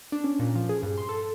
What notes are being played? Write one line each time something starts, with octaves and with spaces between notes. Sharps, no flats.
D4
C#4
A#2
F3
G#4
G2
C6
A4